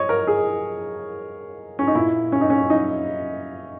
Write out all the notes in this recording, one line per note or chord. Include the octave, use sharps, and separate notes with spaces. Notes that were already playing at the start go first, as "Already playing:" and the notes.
Already playing: C#5 D#5
A#4
G#4
C#4
D#4
A#2 E4
C#4
D#4
C#4
D#4